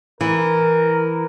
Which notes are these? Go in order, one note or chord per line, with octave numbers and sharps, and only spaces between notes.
E3 A#4